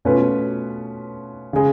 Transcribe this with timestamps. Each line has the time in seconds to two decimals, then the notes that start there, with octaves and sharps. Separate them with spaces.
0.05 B2 A3 C#4 F4 B4
1.53 C#3 G#3